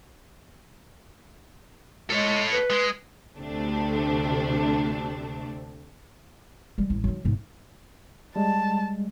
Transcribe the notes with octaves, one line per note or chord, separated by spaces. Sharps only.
G#3 A4 C#5
B4
G#3
D2 C3 A3 D4
G3 G#3
A1
D#3 F#3
G#1 B2
G3 G#3 A5